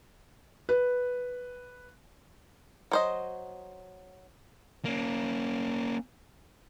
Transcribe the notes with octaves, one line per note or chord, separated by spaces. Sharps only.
B4
F#3 C5 D#5
A#3 C#4